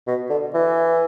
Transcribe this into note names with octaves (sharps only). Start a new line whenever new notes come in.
B2
D3
E3